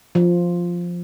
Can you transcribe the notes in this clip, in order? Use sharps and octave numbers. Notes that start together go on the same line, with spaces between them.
F3